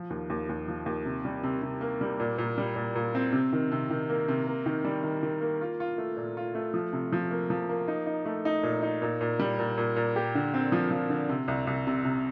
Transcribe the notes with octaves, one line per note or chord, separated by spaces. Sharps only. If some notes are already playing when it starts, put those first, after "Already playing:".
Already playing: F3
D#2
D#2
D#2
F3
D#2
C3
G3
C3
C3
A#3
G3
A#2
A#2
G3
A#2
A#2
C4
C3
D#3
C3
D#3
A#3
C3
A#3
D#3
G3
D#3
D#3
A#3
F4
F4
A3
A#2
F4
A3
F3
C3
F3
A#3
F3
A#3
D#4
D#4
A3
D#4
A#2
D#4
A#2
A#2
G3
A#2
A#2
A#2
G4
D3
C4
F3
F3
D3
C3
C2
C2
C3
C3